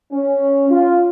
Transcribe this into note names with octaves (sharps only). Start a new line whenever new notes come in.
C#4
F4